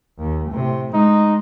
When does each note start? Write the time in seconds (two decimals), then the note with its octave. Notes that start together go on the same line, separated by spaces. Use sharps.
0.19 D#2
0.50 A2 C3
0.94 G#3 D#4